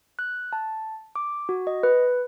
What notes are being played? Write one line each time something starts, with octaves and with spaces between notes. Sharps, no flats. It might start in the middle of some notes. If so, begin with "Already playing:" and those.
F#6
A5
D6
F#4
D#5
B4